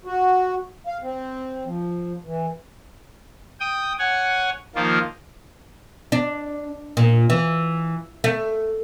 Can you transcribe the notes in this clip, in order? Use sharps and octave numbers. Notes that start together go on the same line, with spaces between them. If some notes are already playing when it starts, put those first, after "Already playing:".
F#4
F5
C4
F3
E3
G5 D#6
C#5 F#5 G#5
D#3 F3 A#3 F4
D4
A#2
E3
A3